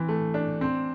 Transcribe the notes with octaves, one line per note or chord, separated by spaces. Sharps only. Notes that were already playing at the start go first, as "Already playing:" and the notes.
Already playing: E3 C4
A3
D4
C4